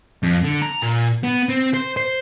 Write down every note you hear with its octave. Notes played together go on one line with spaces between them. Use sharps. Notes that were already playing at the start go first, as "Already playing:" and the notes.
F2
D3
A#5
A#2
B3
C4
C5
C5